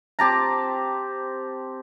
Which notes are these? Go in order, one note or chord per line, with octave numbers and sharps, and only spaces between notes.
C4 G4 A5 A#5